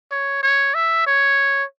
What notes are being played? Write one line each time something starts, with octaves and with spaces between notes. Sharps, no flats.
C#5
C#5
E5
C#5